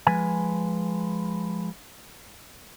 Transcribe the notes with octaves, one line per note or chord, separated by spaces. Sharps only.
F3 G#3 B4 G#5